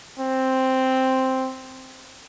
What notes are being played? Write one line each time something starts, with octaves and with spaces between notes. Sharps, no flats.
C4